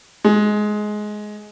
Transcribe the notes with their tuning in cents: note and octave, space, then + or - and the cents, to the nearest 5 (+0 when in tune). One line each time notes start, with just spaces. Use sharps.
G#3 +15